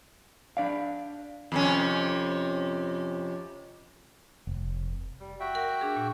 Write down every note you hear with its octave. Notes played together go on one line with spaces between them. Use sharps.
D4 D5 F5
F2 C3 C#4
F1
G3
F#4 E5 G5
A#4 F#5
D4 G#4
A#2